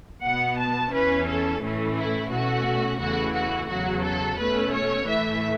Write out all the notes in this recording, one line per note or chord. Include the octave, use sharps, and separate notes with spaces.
B2 B3 F#5
A5
E2 E3 C#4 B4
A4
A2 E3 A3 C#4
E4
B2 A3 C#4 F#4
E2 C#3 E3 A3 F#4
F#4
E2 C#3 F#3 F#4
A4
B2 A3 C#4 B4
C#5
A2 E3 A3 E5